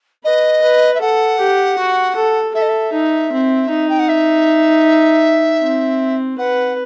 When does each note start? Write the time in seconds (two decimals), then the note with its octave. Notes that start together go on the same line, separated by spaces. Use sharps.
0.24 B4 D#5
0.62 B4
0.95 E5
1.01 A4 F#5
1.40 G4
1.78 F#4
2.16 A4
2.54 A4 E5
2.62 D#5
2.69 E5
2.93 D#4
3.32 C4
3.70 D#4
3.89 G5
3.99 F#5
4.08 E5
5.61 C4
6.38 B4 F#5